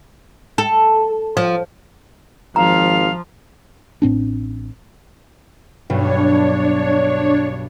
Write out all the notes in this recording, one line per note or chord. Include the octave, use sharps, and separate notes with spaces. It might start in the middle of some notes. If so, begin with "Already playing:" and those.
A4
F3
G#1 F3 F5 A#5
A1 A2 C4 D4
B1 G2 B2 D4 C#5